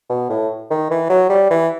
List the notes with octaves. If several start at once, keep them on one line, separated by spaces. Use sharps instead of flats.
B2
A2
D#3
E3
F#3
G3
E3